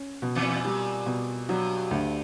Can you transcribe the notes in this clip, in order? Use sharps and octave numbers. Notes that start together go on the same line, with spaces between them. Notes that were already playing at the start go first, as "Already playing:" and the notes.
Already playing: C#4
B2
E2 E3
A#2 G3
B2
G2 F#3
D2